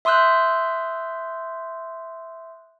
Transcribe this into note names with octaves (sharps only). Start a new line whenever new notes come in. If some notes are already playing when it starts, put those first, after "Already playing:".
E5 C6 D#6 E6 F#6 G6